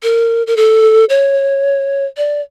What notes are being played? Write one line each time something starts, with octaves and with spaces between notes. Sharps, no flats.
A#4
A#4
A4
C#5
D5